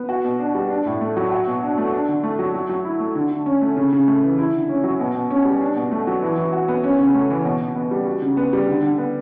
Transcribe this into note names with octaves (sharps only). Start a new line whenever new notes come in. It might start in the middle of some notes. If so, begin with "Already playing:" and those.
Already playing: B3
F#4
B2
D4
G3
D4
A2
A3
F#3
F#4
B2
D4
A3
D4
D3
A3
F#3
F#3
F#3
E4
A3
D3
D3
C#4
A3
C#3
C#3
A3
E3
E4
D3
C#4
F#3
B2
B2
C#4
G3
D4
B2
A3
F#3
E3
E3
F#4
B3
C#4
C#3
A3
E3
B2
B2
B3
G3
F#4
C#3
B3
G3
D3
D3
B3